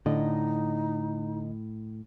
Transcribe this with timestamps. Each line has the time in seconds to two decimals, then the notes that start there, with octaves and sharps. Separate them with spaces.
0.06 A2 D3 D#4 D#5